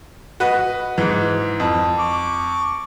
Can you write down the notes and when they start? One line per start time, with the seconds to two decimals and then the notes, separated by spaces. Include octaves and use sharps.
0.40 F#4 B4 D#5
0.98 G#2 E3
1.60 F2
1.99 C#6 D6